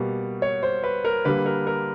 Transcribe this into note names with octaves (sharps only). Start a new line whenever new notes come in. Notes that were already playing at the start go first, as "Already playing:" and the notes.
Already playing: B2 G3 A#3
C#5
C5
B4
A#4
D3 G3 A#3 B4
A#4
A#4